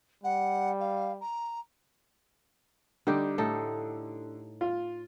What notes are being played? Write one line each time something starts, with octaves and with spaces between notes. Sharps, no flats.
G3 F#5
F5
A#5
D3 G3 D#4 G4
A2 D#4 A4
F4